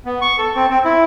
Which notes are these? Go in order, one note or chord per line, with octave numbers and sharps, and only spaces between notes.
B3
C#6
A4
C4
C4
E4